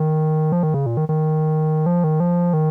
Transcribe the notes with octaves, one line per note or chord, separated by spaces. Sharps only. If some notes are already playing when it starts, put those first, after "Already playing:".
Already playing: D#3
F3
D#3
C#3
A#2
D#3
D#3
F3
D#3
F3
D#3